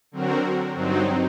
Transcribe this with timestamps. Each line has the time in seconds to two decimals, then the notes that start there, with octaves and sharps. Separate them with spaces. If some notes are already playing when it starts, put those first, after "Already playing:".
0.12 D3 F#3 C4 F#4 A#4
0.74 G2 F#3 C4 D#4